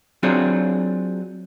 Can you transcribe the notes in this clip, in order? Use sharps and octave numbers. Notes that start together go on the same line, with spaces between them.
F#3 C4 D4 F4 G#4 C#5